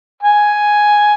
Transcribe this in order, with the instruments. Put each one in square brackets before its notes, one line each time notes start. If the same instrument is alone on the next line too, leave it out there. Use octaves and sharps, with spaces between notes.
[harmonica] G#5